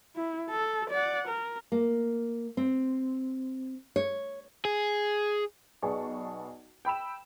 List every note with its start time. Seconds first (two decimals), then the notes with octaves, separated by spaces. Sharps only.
0.16 E4
0.50 A4
0.90 D5 F#5
1.28 A#4
1.72 A#3
2.57 C4
3.96 C#5
4.65 G#4
5.82 B1 B3 G#4 D5 A5 C#6
6.85 G5 B5 E6 E7